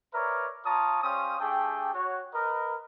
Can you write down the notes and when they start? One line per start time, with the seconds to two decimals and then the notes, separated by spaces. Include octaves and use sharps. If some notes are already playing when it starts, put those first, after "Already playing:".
0.13 A#4 B4 C#5 D5 E5 A#5
0.65 F4 C#5 A5 A#5 D#6
1.03 G3 C#4 C5 C#5 F5 D#6
1.40 A3 D4 G4 G#4 G5
1.94 F#4 C#5
2.34 A#4 B4 D#5